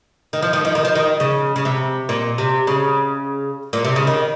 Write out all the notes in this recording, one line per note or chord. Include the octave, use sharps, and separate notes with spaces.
D#3
F3
D#3
F3
D#3
F3
D#3
C#3
C#3
C3
A#2
C3
C#3
A#2
C3
C#3
D#3